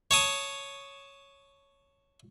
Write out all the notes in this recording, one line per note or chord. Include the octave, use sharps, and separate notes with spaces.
C#5 A5 D#6